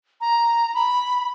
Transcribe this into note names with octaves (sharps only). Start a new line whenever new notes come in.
A#5
B5